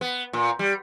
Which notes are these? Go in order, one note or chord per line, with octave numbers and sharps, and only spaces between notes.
B3
A#2
G3